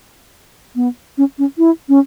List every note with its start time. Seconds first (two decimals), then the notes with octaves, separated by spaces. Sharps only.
0.76 B3
1.18 C#4
1.38 C#4
1.58 E4
1.89 C#4